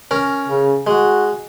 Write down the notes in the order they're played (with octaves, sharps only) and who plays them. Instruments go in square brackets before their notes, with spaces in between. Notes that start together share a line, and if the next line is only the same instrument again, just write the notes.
[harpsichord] C#4 A#4
[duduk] C#3
[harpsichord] G#3 [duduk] F#4